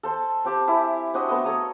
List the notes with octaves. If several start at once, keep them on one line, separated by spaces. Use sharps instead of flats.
A4 C5 A5
C4 G4 A5
E4 G4 E5 G#5
C4 D4 F#4 D#5
A3 B3 D#5
A4 C#5 A#5 D#6